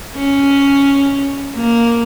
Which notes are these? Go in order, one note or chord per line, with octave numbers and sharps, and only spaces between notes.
C#4
A#3